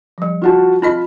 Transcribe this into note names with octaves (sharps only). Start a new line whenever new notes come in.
F3 G3
F4 F#4 A5
C4 F4 D#5 B5